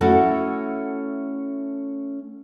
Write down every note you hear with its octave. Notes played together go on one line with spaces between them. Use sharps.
A3 C#4 E4 F#4 A4